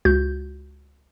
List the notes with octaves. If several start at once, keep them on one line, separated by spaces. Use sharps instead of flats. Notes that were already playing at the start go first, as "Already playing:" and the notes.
C#2 F#4 G6